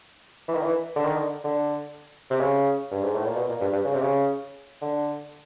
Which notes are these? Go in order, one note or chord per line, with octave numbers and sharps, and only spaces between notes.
E3
D#3
E3
D3
D#3
D3
D3
C3
C#3
G2
G#2
A2
A#2
B2
A#2
G2
G2
C#3
C3
C#3
D3